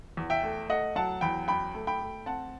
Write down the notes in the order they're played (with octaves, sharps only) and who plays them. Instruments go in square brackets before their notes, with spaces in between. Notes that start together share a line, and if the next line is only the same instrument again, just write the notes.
[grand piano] E2
E5 G5
A3
A3 D#5 F#5
F#3 F#5 A5
E2 G5 B5
F#2 G5 B5
A3
G5 B5
A3
C4 F#5 A5